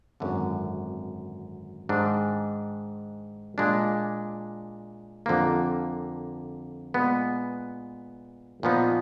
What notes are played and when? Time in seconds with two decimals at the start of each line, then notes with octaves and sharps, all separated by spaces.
0.20 G#1 F#2 D3
1.89 G#2 D#3 G#3 D4
3.58 A#2 G#3 D4
5.26 F2 D3 F3 A#3
6.94 A#2 G#3 B3
8.63 A#2 F3 B3 D#4